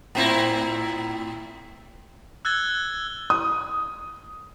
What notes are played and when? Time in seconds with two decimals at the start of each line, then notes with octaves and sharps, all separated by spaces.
0.15 A2 C4 E4
2.45 E6 F#6 G#6 A6 G7
3.30 D#6